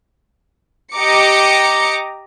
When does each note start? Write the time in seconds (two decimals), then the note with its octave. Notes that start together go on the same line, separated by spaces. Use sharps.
0.94 G4 D#5 A#5 D6 C#7